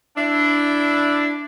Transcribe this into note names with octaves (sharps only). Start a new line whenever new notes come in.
D4 E4